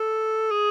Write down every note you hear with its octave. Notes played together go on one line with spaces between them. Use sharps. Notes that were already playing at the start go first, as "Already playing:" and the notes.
Already playing: A4
G#4